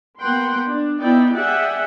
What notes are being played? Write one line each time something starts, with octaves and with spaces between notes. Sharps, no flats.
A#3 B3 F#5 G5 C6
D4
B3 D#4 E4 D5 G5
G#4 D5 E5 F#5 G5